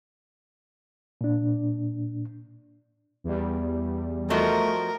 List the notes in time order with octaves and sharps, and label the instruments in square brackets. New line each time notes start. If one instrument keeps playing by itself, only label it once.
[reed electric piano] A#2 D4
[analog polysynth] E2 G3
[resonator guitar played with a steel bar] F3 F#4 D#5 [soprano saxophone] A3 [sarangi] A#4